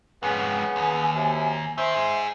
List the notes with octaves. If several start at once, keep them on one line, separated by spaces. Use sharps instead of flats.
F2 G#2 C#3 B3 G#5
D#2
F#2 C3
D#3 C5 E5
D#4 G#4